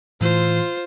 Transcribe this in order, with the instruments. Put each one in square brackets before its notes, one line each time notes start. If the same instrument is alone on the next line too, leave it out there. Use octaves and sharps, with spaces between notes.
[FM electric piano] A2 E3 [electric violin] F4 C5